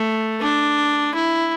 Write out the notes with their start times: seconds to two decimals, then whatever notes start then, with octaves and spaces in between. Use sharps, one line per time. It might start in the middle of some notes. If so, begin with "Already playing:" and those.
Already playing: A3
0.41 D4
1.14 E4